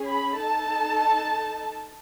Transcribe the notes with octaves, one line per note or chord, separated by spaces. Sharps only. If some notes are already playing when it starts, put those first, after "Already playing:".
Already playing: C#4 G#4
B5
D#4 A4 A5